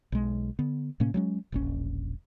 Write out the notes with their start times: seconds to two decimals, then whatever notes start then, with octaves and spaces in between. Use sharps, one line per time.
0.12 B1 G#3
0.59 D3 B3
1.00 A2 C3 A#3 C#4
1.14 F#3 G#3 C#4
1.52 E1 A#1 C#4